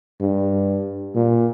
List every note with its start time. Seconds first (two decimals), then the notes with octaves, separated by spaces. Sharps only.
0.21 G2
1.15 A#2